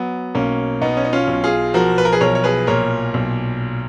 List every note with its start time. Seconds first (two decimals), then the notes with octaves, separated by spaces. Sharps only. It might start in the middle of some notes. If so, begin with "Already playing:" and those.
Already playing: F#3 B3
0.35 B1 A#3 C#4
0.81 B2 B3 D#4
0.97 C#4
1.05 D#4
1.13 C#4 F4
1.28 B1
1.44 F4 G#4
1.74 F3 F#4 A#4
1.98 B4
2.05 A#4
2.12 G#4 B4
2.21 B1 A#4 C#5
2.35 C#5
2.44 G#4 B4
2.67 A#2 A#4 C#5
3.14 B1